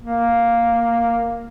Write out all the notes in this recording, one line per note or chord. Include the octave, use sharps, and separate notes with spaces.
A#3